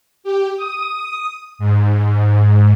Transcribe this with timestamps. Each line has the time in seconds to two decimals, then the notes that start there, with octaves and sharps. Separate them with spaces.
0.24 G4
0.57 D#6
1.59 G#2